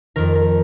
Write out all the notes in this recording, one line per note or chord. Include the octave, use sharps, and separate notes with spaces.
F2 D#3 A#4
A#4